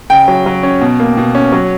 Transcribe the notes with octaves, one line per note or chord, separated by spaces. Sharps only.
C#3 G5
F#3
F#3
C#4
B2
A#3
B2
C#4
F#3